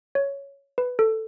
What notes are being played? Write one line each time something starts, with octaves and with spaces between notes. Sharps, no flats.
C#5
B4
A4